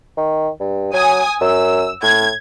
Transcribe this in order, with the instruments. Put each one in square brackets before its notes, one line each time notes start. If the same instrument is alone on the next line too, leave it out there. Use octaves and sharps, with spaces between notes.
[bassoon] D#3
G2
[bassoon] F#3 [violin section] G#5 D#6
[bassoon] F#2 [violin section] E6
[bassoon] A2 [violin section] G#6